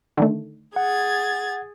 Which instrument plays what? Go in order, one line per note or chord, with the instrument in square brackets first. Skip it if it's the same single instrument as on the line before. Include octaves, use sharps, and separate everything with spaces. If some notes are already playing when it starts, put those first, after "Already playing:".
[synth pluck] D3 D#3 A3
[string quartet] G#4 G#6 A6 [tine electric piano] F#5